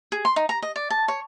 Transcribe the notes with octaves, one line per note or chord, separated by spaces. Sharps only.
G#4
C6
D#4
A#5
D#5
D5
A5
C#5